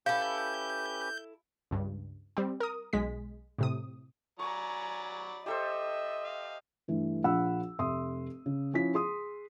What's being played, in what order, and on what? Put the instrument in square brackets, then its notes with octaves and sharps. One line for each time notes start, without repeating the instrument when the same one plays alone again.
[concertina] C#4 G4 B4 [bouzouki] E4 A4 [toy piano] F5 [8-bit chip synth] G6
[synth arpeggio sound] C#2 G2
G3 C4
A#4 D#6
B1 G#3 B6
A2 C3 D#6
[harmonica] F#3 D5 B5 [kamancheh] G#5 A#5 [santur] C#6
[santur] G4 A4 C5 [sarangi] D#5 [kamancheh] E5
[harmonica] F5
[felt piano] G2 E3 A3
A#1 F3 F#5 B5 E6
F1 E5 C6 D#6
C#3
F3 C#4 E4 B6
G#4 C6 D#6